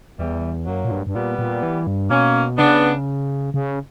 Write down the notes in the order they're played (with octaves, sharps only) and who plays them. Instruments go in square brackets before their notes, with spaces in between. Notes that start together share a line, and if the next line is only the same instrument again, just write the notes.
[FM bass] E2 [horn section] E3 G3
[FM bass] F#2 [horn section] F#3 A#3
[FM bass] A#2
G2
G2
[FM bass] A#2 [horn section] G3 B3
[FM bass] A#2
E3
G2
[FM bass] B2 [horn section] A#3 C#4
[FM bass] C#3 [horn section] B3 D4
[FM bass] C#3